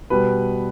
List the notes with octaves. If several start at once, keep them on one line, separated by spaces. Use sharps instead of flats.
B2 G3 B4